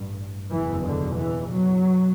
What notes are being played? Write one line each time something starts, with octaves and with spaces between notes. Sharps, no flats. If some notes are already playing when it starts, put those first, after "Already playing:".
Already playing: A1 G2
F#1 E2 B2 E3
D3
E3
F#3
B2